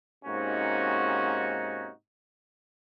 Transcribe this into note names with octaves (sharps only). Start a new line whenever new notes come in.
G#2 C3 A#3 C#4 D#4 F#4